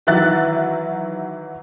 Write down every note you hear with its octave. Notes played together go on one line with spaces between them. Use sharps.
D#3 E3 F#3 E5 F#6 A6